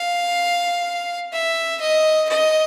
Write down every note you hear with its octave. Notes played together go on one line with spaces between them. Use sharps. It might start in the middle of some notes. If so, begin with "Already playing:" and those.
Already playing: F5
E5
D#5
D#5